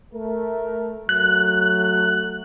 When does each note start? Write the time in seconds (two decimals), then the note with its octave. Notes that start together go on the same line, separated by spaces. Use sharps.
0.14 A3 A#4
1.09 F#3 A3 F#6